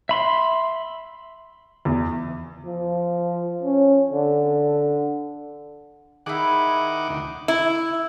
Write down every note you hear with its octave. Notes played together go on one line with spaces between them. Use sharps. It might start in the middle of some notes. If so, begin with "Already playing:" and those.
E5 B5 C6
E2
F3
C#4
D3
D#3 E4 G#4 F#5 D6
D2 D#3
E4